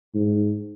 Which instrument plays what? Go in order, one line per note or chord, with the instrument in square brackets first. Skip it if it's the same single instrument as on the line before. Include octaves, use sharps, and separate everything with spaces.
[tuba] G#2